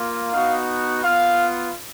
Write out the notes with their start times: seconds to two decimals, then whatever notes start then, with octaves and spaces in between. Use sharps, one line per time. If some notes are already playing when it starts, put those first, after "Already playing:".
Already playing: A#3 F4
0.32 B3 D#4 F#4 F5
1.04 B3 F4 F5